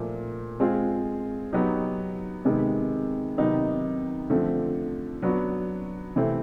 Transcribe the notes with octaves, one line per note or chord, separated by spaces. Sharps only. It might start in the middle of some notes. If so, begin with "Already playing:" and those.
Already playing: A#2 F3 A3
G#3 C4 F4 G#4
F#3 B3 D#4 G4
C3 D#3 G#3 B3
C3 D#3 F#3 B3 D#4
D3 F3 A3 C4
F#3 B3 D4 F#4
C3 E3 A3 C4 E4